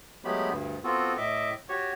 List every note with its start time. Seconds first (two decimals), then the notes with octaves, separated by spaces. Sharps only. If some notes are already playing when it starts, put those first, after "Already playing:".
0.24 F#3 G#3 A3 B3 G4 B5
0.50 D2 G2
0.84 B3 C4 F4 F#4 A4
1.17 A2 D#5 E5 D6
1.69 F#4 G4 C#5